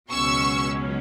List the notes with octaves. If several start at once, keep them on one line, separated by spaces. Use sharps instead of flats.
C#2 B2 F#3 C#4 C#6 E6